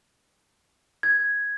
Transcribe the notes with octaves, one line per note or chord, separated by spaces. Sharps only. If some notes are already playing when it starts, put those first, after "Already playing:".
G#6